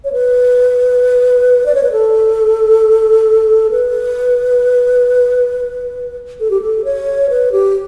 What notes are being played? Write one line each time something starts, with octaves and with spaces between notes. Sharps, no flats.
C#5
B4
D5
C#5
B4
A4
B4
A4
G4
A4
C#5
B4
G4